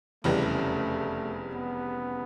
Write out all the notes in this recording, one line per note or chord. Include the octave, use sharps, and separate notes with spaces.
F1 E2 C#3 E3 G3 A3
B3